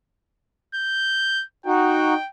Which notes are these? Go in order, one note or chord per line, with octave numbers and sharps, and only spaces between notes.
G6
D#4 F#4 G5